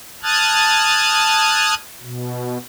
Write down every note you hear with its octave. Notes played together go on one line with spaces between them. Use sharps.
A5 D#6 F6 F#6 G#6 A6
B2